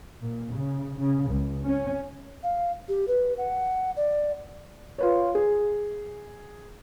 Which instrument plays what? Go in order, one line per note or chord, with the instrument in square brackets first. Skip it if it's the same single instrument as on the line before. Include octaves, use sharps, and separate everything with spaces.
[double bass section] A#2
C#3
C#3
C#2
C#4
[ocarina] F5
G4
B4
F#5
D5
[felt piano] F4 B4 C#5
G#4